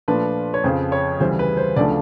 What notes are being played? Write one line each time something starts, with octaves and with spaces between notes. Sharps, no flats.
A#2 F3 A3 D4 B4
C#5
F2 C#3 F3 C5
C#5
D2 C#3 E3 G3 C5
B4
C5
D2 C#3 F3 A3 D4 D5